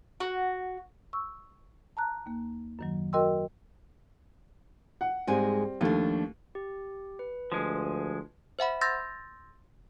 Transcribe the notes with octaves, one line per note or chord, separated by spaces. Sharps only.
F#4
C#6 E6
A5 A#5 F#6
D#2 A#3
F#2 D#3 F#3
F#4 A#4 D#5 G5 C6 E6
F#5
G#2 G3 G#3 C4 G#5
D#2 F3 A3 D4
G4
B4
D2 F3 G#3
C5 E5 F#5 B5
C6 E6 G6 A6 A#6